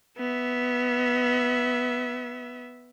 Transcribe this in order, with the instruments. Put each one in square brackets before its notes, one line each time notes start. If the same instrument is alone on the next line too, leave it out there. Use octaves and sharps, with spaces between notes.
[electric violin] B3 E5